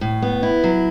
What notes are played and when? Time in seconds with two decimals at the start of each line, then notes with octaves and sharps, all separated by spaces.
0.01 A2
0.22 B3
0.43 E4
0.64 F#3